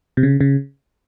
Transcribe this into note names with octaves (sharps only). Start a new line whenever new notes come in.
C3
C#3
C#3